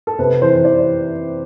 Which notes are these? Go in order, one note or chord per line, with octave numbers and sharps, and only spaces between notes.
A4
C3 B4
E3 C5
E3 D5